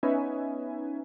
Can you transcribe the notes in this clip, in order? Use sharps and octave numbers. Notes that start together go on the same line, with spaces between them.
B3 C#4 D#4 B4 E5 G#5